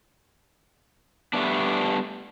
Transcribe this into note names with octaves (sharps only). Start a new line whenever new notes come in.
G3 A3 B3 D4